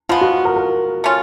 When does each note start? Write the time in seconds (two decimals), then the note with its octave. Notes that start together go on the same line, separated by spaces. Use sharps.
0.09 F3 G#3 B3 F4
0.21 F#4
0.45 A#4
0.56 A#4
1.04 A3 C#4 F4